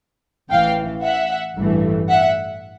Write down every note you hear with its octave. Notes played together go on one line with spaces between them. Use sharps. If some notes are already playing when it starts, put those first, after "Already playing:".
A1 A2 E3 F5 G5
E5 F#5
A1 G2 E3 A3
E5 F#5